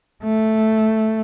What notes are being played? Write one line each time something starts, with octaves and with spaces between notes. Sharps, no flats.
A3